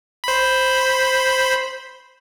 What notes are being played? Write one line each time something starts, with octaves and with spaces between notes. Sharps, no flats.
C5 B5